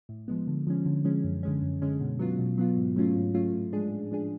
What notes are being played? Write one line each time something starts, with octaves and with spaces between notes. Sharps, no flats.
A2
F3 G#3 B3
D3
F3 G#3 C#4
D3
F3 G#3 C#4
F#2
D3 G#3 C#4
F#2
D3 G#3 C#4
B2
F#3 B3 F4
B2
F#3 B3 F4
G#2
F#3 A3 C#4 F4
G#2
F#3 A3 C#4 F4
A2
F3 G#3 D4 G#4
A2
F3 G#3 D4 G#4